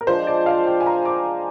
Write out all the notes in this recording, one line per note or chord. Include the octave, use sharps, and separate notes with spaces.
A#4
F3 G#3 D4 C5
D5
F5
G5
G#5
A#5
D6